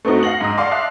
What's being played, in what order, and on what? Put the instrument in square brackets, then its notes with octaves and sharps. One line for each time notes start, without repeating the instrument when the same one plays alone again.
[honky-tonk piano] A3 B3 C4 D#4 F#4
F5 F#5 A#6 F#7
G#2 D#6
D5 F5 F#5 A5 C6 D6
E5 F5 A5 F#6